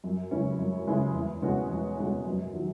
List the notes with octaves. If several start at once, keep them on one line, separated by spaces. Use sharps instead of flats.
F#2
C#3 G#3 C#4 E4
F#2
C#3 G#3 C#4 E4
E2
B2 G#3 C#4 F#4
E2
B2 G#3 C#4 F#4
F#2
D#3 F#3